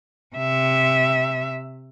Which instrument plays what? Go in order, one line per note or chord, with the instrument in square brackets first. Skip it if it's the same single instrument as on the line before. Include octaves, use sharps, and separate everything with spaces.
[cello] C3 E5